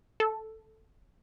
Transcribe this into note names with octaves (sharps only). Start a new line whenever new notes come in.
A4